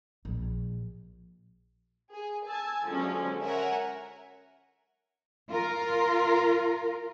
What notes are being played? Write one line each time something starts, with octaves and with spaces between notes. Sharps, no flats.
A#1
G#4
G#5 A5 E6 G#6
D3 F3 F#3 G#3 C#4
A#4 C#5 E5 F#5 G#5 A#5
F4 A#4